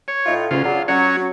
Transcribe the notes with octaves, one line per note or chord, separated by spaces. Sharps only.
C#5
A2 D#4 F4
D2 C#3 F4
C#3 F#3 D4 F4
F#3 C#4 F#4 C#5